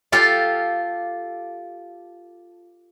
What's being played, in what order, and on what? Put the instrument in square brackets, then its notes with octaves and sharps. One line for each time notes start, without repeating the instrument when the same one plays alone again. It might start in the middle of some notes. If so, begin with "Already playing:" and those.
[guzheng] F4 G4 A4 F5